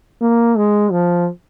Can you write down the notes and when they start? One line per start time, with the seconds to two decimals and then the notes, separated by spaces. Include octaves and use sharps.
0.21 A#3
0.57 G#3
0.91 F3